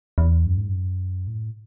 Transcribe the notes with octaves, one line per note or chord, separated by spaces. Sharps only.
E2
F#2
G#2
F#2
A2